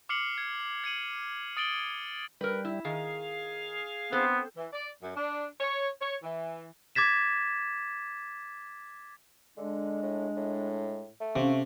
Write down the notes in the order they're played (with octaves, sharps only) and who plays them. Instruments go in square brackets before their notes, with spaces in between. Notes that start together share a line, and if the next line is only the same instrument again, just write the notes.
[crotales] D6 F6 C7 C#7 F#7
G#6
G#6 C#7 D#7 F#7
D#6 A6 D7 F#7 G7
[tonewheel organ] G3 [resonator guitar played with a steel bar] A#4 B4
[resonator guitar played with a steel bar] E4
[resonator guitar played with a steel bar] D#3 [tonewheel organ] G#4 F5
[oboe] B3 [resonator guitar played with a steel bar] C4 A4 C5
[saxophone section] E3
D5
F#2
D4
C#5
C#5
E3
[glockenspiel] D6 G#6 A6 B6 E7
[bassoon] D3 [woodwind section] G#3 D4
[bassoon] A2
A2
A3
[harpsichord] C3 [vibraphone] C#4 F5